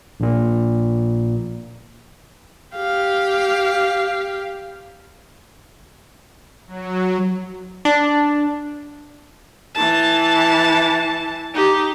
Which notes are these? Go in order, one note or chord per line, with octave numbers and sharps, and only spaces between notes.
A#1 A#2
G4 F5
F#3
D4
E3 A5
D#4 G4